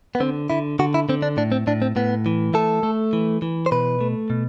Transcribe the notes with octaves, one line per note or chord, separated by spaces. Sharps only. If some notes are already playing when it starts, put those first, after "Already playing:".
B3
D3 C4
D3 E4
D3 F#4
E4
D3 C4
D4
A2 D4
C4
A2 D4
C4
A2 B3
E3
A3 A4
A3
E3
E3
C5
B2 B4
A3
B2